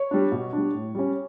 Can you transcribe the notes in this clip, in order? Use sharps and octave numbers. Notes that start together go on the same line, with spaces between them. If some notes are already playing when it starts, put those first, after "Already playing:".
Already playing: C#5
G3 D4
B2
G3 D4
A2
G3 C#4